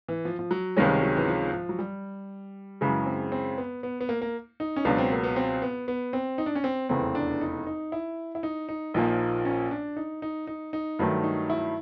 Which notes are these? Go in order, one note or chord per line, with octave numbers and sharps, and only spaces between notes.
E3
F3
F3
F#3
C#2 C3 D#3 G3 G#3 C#4
F#3
E3
F3
F3
F#3
G3
F#2 C#3 E3 G#3 C#4
C4
C4
B3
B3
B3
A#3
A#3
D#4
C#4
C#2 B2 F#3 D4
C4
A#3
B3
C4
B3
B3
C4
D#4
D4
C#4
C4
F1 E2 C#3 E3 C4
D4
D#4
D#4
E4
E4
D#4
D#4
A#1 A#2 F3 A#3 D#4
C#4
D4
D#4
D#4
D#4
D#4
G2 D#3 F#3 A3
D#4
E4